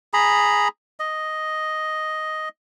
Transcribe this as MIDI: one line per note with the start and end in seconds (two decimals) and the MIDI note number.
0.14 0.68 68
0.14 0.68 82
0.14 0.68 83
1.00 2.49 75